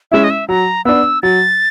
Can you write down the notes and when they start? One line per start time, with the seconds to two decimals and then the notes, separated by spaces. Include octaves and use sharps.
0.11 G#3 C#4 E4 E5
0.24 D#5
0.30 E5
0.48 F#3 A#5
0.85 B3 D4 E6
1.23 F#3 A6